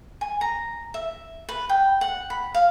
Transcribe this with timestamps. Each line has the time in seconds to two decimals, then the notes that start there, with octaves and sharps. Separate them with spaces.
0.21 G#5
0.41 A#5
0.94 E5
1.49 B4
1.69 G5
2.01 F#5
2.30 B5
2.54 F5